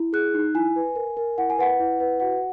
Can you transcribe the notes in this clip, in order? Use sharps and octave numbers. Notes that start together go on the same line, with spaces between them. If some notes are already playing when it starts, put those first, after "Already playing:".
Already playing: E4
G#4 F#6
D#4
E4 G#5
B4
A#4
A#4
E4 F#5
G#5
B4 F#5
E4
B4
F#4 F#5